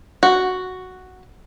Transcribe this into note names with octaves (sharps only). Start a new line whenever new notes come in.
F#4